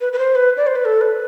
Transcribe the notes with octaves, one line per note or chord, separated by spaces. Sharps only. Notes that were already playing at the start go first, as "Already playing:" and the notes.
B4
B4
C5
B4
D5
C5
B4
A4
B4